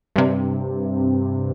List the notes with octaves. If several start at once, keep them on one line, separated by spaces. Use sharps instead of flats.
G2 C3